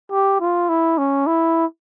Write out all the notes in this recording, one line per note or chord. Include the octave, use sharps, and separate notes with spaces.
G4
F4
E4
C#4
E4